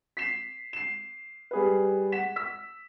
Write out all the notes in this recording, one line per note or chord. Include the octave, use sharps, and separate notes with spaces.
B6 C7 E7
C7 E7
G3 G#4 B4
F#5 B6 E7
E6 B6